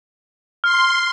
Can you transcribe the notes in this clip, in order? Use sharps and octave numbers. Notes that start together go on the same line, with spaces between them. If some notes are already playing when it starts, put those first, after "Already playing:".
C6 F6